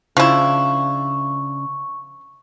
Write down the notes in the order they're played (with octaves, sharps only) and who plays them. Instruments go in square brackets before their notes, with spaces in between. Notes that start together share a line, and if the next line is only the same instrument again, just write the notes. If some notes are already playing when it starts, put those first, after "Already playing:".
[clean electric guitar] C#3 D4 [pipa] F3 E4 [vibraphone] C#6